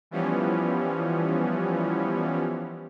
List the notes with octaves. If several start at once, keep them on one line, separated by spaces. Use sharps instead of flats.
E3 F3 G3 B3 C#4